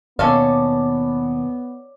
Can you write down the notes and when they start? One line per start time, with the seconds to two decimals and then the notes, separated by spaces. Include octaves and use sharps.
0.19 D#2 B2 B3 C#4 A4 C#5 D5 F5